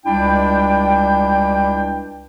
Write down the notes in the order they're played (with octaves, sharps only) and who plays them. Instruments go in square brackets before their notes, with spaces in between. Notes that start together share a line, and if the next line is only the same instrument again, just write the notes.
[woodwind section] C#2 G3 D4 E4 G5